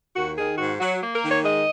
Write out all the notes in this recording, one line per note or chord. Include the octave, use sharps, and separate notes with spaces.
D#2 F#4
D#3 G#4
G#2 F#4
F#3 F#4
A#3
A#4
D#3
C#5
G#3 D#5